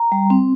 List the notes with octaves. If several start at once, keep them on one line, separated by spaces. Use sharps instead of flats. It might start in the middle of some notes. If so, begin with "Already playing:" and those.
Already playing: A#5
G3
C4